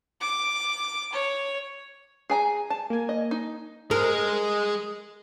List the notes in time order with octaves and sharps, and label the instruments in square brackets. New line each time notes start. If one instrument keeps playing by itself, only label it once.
[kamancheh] D6
C#5
[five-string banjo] G#4 G#5 A#5
A5
[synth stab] A#3 G#5
[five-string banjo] D#5
D#4
[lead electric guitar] G#3 G#4 [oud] A#4